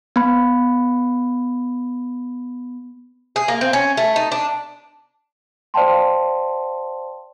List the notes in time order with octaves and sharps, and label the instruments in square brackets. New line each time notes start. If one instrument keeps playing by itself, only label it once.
[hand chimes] B3 B5
[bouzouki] G#4
A#3
C4
C#4
A3
D#4
D4
[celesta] C5 D5 F5 G5 A5 C6